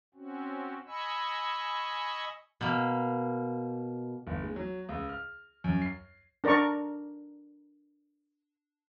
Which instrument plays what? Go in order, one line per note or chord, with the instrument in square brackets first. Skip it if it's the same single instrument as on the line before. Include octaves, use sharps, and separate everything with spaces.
[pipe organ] C4 C#4 F#4
D#5 G#5 B5 C#6 E6
[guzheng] B2 A#3
[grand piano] G1
G#3
F#3
C#2
F6
F#2
C7
[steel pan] D4 A#4 D5 A#5 C#6